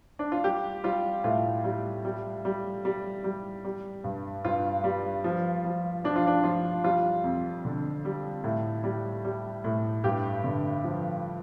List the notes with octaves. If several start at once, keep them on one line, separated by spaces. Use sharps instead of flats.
D4
F4
G3 G4
G3 F4
A2 F4
G3
G3
G3
G3
G3
G3
G2
G2 F4
G3
F3
F3
F3 D4
F4
D4
F3 F4
G3 F4
F2
D3
G3
A2
G3
G3
A2
G2 G4
D3
F3